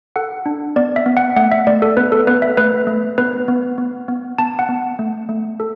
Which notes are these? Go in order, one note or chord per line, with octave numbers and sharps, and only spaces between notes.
A4 F#5
D4
B3 D5
E5
B3
F#5
A3 F#5
E5
A3 D5
A4
B3 B4
A4
B3 B4
E5
A3 B4
A3
B3 B4
B3
B3
B3
B3 A5
F#5
B3
A3
A3
A4